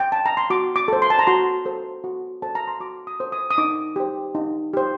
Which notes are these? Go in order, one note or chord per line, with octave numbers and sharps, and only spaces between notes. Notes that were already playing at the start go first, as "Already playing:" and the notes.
G5
A5
A#5
C6
F#4 D6
D6
A4 C5
C6
A5
A#5
F#4 C6
A4 C5
F#4
A4 C5 A5
A#5
C6
F#4 D6
D#6
A4 C5
D#6
D#6
D#4 D6
G4 C5
D#4
G4 C5